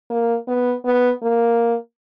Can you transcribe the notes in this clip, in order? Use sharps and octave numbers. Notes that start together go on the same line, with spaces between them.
A#3
B3
B3
A#3